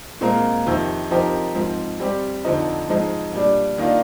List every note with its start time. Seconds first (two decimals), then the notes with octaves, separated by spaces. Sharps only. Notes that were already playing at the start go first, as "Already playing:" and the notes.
0.21 A#2 G#3 C4 F4 A#4
0.67 F2 C3 D#3
1.11 F3 C4 D#4 G4 A#4
1.55 G#2 F3 C4
2.00 G3 C4 G4
2.45 F2 D3 F3 C4 D#4
2.89 G#2 F3 G#3 D#4
3.33 A#2 G3 D4
3.78 D#3 A#3 D4 F4